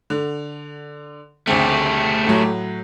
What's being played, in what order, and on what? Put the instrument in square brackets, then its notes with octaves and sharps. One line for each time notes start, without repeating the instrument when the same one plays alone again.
[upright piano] D3
[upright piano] D2 C#3 C4 [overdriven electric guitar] A3 G4
[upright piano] A2 F#3